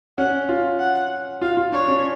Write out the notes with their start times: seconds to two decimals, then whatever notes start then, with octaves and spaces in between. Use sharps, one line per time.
0.18 C#4 F#5
0.49 F4
0.80 F#5
1.42 F4 F5
1.57 F4
1.72 D4 C#5
1.88 C#4